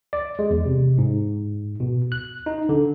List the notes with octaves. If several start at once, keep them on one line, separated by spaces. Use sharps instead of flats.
D5
G#3
E2
C3
G#2
B2
F#6
D#4
D3